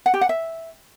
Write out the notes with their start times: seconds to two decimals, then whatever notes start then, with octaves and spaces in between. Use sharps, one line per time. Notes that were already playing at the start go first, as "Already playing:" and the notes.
0.06 F#5
0.14 G4
0.21 F#5
0.29 E5